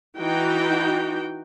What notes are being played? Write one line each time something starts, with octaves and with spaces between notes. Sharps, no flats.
E3 D#4 F#4 G5